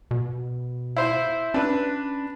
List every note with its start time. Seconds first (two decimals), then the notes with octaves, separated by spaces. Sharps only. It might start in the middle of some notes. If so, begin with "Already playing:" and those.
0.11 B2
0.96 E4 C5
1.54 C#4 D4 B4